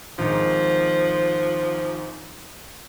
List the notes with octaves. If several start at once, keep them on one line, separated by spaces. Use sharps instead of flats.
G#1 G#2 F3